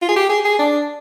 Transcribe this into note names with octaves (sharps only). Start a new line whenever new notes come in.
F4
G#4
G4
G#4
G#4
D4